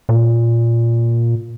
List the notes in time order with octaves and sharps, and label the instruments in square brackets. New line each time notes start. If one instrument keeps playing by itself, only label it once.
[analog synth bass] A#2